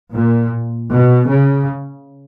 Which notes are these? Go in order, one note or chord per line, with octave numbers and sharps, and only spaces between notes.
A#2
B2
C#3